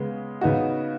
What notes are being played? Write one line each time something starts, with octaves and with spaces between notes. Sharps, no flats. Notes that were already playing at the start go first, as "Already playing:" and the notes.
Already playing: C#3 G#3 B3
C#3 B3 D#4 F#4